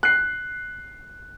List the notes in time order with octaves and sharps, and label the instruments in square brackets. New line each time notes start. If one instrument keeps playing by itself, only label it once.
[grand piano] F#6 C7